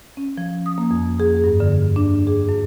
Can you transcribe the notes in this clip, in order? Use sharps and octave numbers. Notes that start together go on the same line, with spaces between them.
C#4
F3
D#6
A#3
F2
G#4
G2
D3
D4
G#4
F#2